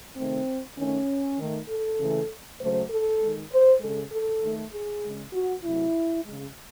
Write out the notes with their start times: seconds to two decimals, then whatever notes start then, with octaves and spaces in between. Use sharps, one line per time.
0.16 C3 D#3 A3 C4
0.77 D#3 A3 C#4
1.38 D#3 A3
1.69 A4
1.99 C#3 E3 A3
2.61 C#3 F#3 A3 C5
2.90 A4
3.20 D#3 G#3
3.51 C5
3.81 C#3 G#3 A4
4.12 A4
4.42 D#3 A3
4.73 G#4
5.03 C#3 G#3
5.33 F#4
5.64 C3 F#3 A3 E4
6.25 C#3 G#3